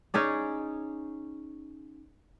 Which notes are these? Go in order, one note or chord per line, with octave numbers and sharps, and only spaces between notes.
C#4 D#4 G#4 D5